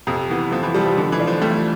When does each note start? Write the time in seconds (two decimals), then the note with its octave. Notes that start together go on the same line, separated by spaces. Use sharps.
0.07 F2 C3
0.30 E3 B3
0.52 F2 F3
0.63 E3
0.74 C3 F3 G3
0.86 F3
0.97 B2 D3
1.12 E3
1.20 A3 D4 F4
1.27 F3
1.42 G3 A3